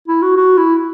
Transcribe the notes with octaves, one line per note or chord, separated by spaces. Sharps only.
E4
F#4
F#4
E4